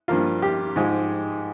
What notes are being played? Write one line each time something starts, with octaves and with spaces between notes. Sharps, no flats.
G2 F3 A#3 F4
G4
G#2 F3 G#3